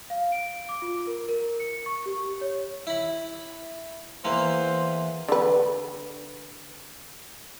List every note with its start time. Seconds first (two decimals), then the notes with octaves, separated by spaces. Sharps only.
0.10 F5
0.32 D7
0.69 D6
0.82 F4
1.07 A#4
1.28 A#4
1.60 C#7
1.86 C#6
2.06 G4
2.41 C#5
2.87 E4 B5
4.25 E2 E3 A#3 C5
5.28 D3 B4